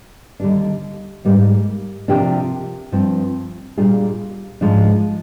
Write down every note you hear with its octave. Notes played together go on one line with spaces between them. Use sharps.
D#2 D3 G3 D4
G#2 G3 A#3 D#4
C3 F3 A#3 D4 G4
G2 F3 C4
A#2 G3 D4 F4 G#4
G#2 F3 G#3 D4